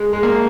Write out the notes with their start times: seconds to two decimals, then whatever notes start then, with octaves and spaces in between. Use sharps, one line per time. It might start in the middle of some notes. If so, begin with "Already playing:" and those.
Already playing: G#3
0.13 G#3
0.23 A#3